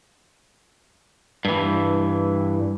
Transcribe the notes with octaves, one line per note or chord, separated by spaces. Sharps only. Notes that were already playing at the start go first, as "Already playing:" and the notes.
G2 E3